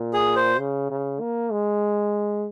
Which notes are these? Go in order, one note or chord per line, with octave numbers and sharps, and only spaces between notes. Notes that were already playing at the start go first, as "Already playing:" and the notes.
Already playing: A#2
G#4
C5
C#3
C#3
A#3
G#3